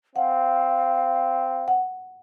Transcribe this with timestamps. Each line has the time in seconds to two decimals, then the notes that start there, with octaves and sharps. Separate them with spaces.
0.16 C4 F5 F#5
1.68 F#5